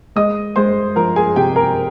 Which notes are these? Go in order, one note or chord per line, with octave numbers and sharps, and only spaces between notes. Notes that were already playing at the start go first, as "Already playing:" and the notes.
G#3 D#5 D#6
G#3 C5 C6
F3 A#4 A#5
G#4 G#5
C3 G4 G5
A#4 A#5